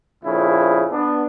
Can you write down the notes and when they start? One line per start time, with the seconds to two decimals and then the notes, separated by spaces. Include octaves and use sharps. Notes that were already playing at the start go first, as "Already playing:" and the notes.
0.23 A#1 F2 C#3 E4
0.92 B3 D4